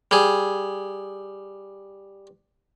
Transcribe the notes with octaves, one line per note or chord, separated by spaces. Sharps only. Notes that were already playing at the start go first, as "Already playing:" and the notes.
G3 G#4